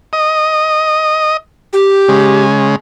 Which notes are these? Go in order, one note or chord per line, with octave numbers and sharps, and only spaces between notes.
D#5
G4
C#3 G#3